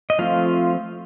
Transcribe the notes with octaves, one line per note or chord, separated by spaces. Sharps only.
D#5
F3 A3 C4 F4 F5